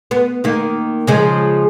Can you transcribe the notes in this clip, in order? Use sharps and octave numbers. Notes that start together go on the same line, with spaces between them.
B3
D#3 A#3
C#3 F3 G#3